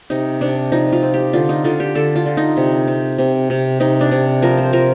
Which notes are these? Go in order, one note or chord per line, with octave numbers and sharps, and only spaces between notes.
C3 D#4
C3 D4
F3 D#4
F4
C4
G4
D3 F4
D#4
D3 F4
G4
D3 A4
F4
D3
D#4
C3
C4
C3
C3
C3 D#4
D4
C3
F3 A#4
C5
F3 A#4